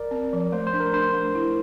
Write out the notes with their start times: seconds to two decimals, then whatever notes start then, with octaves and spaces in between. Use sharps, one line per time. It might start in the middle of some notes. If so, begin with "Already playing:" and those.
Already playing: A#4 D5
0.11 C4
0.33 F3
0.52 A3 C5
0.67 C5
0.73 D4
0.80 A#4
0.93 D4 C5
1.14 A3
1.35 E4